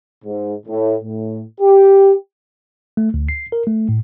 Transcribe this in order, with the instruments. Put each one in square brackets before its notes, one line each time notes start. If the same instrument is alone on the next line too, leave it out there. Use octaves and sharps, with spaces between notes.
[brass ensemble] G#2
A2
A2
G4
[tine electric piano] A3
D2
C7
A#4
A3
A2